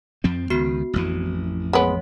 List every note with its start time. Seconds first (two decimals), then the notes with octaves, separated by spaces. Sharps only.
0.24 F2 F3 C4
0.50 C#2 D#3 B3 F#4 C7
0.93 A1 F2 E3
1.73 G#3 B3 C#5 F#5